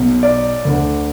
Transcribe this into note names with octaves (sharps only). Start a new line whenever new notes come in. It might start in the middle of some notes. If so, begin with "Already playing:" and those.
Already playing: B1 B2
D5
D2 D3